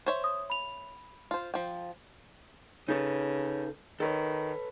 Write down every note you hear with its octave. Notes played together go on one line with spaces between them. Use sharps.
C5 C#5 E5
D#6
B5 F7
F4 C5
F3 G5
C#3 D#4 A4 B4
D#3 A4 B4 C#5